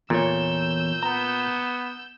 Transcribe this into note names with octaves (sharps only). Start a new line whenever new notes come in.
E2 A#2 A4 C#5 E6 G6
B3 A#5